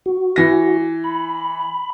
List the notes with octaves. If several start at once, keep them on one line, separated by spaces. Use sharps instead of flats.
F#4
E3 A#6
B5